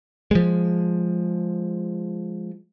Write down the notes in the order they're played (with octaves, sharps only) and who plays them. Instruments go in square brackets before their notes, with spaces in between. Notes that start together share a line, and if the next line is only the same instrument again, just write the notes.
[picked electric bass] F3 G#3